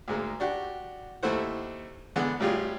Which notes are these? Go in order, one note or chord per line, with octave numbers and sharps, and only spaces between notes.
D2 G#2 G#3 A#3
D4 F#4 G4
D#2 A3 E4 C5 F#5
D3 E3 G#3 B3
G#1 A2 G3 F4 G4 G#4